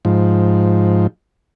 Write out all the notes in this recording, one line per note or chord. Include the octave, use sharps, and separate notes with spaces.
G#2 F3